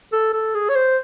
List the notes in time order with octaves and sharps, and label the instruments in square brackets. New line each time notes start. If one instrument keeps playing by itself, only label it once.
[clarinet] A4
A4
G#4
C#5
C5